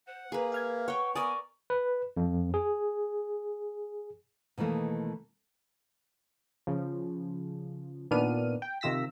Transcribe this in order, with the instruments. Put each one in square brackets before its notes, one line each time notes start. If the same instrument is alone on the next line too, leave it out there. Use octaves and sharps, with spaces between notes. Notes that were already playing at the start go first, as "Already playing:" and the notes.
[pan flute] C5 [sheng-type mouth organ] F#5
[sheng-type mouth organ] A#3 [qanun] G#4 B4 [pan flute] A#5
[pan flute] E5 [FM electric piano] F5 F6 G#6
[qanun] C#5 G5 [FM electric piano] F#5 [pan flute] C#6
[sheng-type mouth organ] B3 [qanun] A#4 D5 [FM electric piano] G#5 D#6 [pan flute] C#6
[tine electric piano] B4
F2
G#4
[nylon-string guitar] B2 D#3 E3 A3 A#3
[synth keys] C#3 F3
A#2 D#3 B3 D4 F6 D#7
G5
C3 D#3 F4 E6 A#6 B6